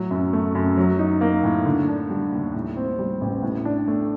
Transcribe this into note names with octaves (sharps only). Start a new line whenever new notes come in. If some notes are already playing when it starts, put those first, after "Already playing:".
Already playing: A2 F#3
F#2
A3
F#2
F#3
D#4
A#3
A2
D3
D4
G3
D#2
A2
C4
G3
A1
A2
D4
A3